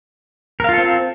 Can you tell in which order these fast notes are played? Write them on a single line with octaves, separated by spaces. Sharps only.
A#4 F5 F4 A4 C4